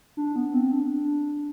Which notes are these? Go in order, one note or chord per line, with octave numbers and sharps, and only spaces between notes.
D4
B3
C4
D4